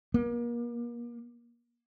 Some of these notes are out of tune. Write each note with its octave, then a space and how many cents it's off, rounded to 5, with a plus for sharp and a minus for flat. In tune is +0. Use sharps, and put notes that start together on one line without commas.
A#3 +35